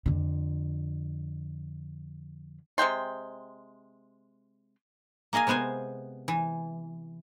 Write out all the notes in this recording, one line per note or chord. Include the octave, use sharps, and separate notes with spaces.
F2 D3
C3 G#3 G5 C6
A#3 G#4 D#5 F5 G#5
C3 G#3 B3 C5 G#5
E3